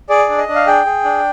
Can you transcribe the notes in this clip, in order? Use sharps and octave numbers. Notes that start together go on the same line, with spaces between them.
G#4 D5
D4
D#5
D4
F5
G#4 G5
G#4
D4